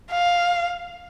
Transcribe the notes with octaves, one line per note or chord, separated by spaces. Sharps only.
F5